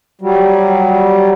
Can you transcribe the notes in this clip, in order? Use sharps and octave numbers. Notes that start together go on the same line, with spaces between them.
F#3 G3